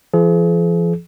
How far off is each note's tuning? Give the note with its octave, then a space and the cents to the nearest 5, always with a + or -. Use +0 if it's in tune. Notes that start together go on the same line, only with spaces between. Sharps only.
F3 -40 G#4 +40